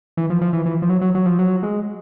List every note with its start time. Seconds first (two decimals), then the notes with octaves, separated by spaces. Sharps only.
0.17 E3
0.30 F3
0.41 F3
0.53 E3
0.66 E3
0.82 F3
0.90 F#3
1.01 F#3
1.15 F#3
1.26 F3
1.39 F#3
1.63 G#3